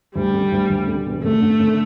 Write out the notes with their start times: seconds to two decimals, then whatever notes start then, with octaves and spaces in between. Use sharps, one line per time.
0.15 D2 G3
0.34 D3
0.52 D2
0.70 D2
0.87 D3
1.06 E1
1.23 D3 A3
1.42 D3
1.60 D3